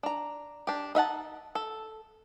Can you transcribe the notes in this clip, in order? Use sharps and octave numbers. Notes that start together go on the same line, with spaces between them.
D4 A#5
D4 G4
D#4 E5 F#5 A5
A4